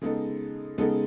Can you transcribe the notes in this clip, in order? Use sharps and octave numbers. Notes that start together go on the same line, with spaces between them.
C#3 G#3 B3 D#4 A4
C#3 G#3 B3 D#4 A4